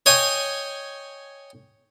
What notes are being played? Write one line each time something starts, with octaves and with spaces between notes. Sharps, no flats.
C#5 D#5 G5 G#5